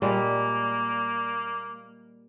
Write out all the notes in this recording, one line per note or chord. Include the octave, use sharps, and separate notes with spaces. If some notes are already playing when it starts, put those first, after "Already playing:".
A#2 G3 G#3 A#3